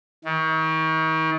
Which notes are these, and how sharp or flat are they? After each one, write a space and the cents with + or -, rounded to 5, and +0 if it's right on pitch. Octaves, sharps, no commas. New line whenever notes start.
D#3 +40